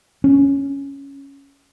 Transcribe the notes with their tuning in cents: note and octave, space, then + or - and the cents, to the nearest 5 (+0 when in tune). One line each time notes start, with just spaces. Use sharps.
C#4 +5